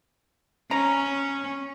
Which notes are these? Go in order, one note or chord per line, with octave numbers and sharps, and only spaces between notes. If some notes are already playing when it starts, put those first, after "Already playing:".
C#4 A#5